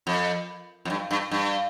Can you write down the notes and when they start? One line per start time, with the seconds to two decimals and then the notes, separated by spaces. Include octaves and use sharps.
0.07 F2
0.85 F2
0.90 G2
1.11 G2
1.31 G2